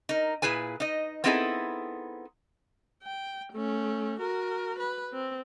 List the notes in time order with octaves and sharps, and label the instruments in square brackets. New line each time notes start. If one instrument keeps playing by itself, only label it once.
[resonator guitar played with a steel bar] D#4 A#4
A#2 E4 G#4 B4 G#5
D#4 D#5
B3 C4 D#4 E4 G#4 A4
[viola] G5
A3 C#4
F#4 A#4
B4
C4